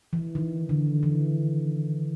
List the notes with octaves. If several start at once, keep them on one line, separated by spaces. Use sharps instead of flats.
E3
D#3
D3
E3